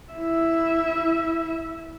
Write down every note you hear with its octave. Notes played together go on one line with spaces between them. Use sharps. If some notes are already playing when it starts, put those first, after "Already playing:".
E4 E5